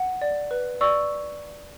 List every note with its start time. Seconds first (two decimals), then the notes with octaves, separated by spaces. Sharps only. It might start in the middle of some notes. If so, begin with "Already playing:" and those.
Already playing: F#5
0.21 D5
0.51 B4
0.81 D5 C#6 E6